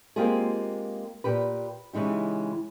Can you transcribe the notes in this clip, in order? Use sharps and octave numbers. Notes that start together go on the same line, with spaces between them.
G#3 A#3 C4 F4 G4 G#4
A#2 G4 B4
C#3 E3 G#3 D#4 G4